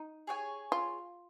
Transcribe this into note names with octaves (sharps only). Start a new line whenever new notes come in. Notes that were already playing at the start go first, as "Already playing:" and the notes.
Already playing: D#4
G#4 C#5 F5 G#5
F4